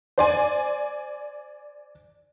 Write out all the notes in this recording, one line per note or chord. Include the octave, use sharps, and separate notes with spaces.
C5 D5 G#5